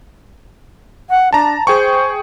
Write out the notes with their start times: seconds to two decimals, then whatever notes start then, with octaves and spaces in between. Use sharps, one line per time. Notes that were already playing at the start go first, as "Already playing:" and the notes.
1.09 F#5
1.33 D4 A5 A#5
1.67 G#4 C5 G5 C#6